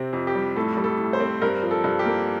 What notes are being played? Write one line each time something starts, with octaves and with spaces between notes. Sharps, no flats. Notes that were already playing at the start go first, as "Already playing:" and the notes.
Already playing: C3 C4
F2
G4
G3
A2 A4
G3
A4
A2
C5
C4
G2 A#4
F3
A4
G2
G4
A#3